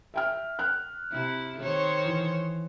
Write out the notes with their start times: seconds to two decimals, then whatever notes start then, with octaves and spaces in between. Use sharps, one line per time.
0.14 E5 G5 F6
0.59 F6 F#6
1.11 C3 E4
1.60 D#3 C5 C#5
2.06 E3